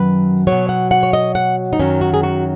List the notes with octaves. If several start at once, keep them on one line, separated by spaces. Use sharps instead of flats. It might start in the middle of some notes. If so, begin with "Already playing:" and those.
Already playing: F#2 D#3 F#3 B4
B2 F#3 C#5
F#5
F#5
C#5
D#5
F#5
D#4
F#2 D#3 F#3 C#4
F#4
G#4
F#4